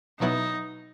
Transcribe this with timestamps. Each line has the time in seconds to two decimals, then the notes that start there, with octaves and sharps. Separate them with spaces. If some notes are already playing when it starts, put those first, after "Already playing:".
0.20 B2 F#3 B3 D#4 E4